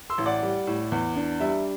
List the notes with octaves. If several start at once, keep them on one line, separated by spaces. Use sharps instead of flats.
C6 E6
A1
D5 F#5
G3
A2
E2
D4
G3 E5